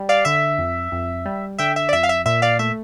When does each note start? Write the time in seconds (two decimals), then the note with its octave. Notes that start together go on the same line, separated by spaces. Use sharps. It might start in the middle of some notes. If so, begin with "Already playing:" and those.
Already playing: G3
0.09 D5 F5
0.25 D3 E5
0.58 F2
0.92 F2
1.25 G3
1.59 D3 E5 G5
1.76 E5
1.89 D5
1.93 F2 E5
2.03 F5
2.09 E5
2.26 A#2 E5
2.42 D5 F5
2.59 A3 E5